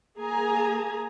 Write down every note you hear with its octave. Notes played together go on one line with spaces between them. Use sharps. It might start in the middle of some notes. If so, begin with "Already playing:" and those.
A#3 G#4 G#5 A#5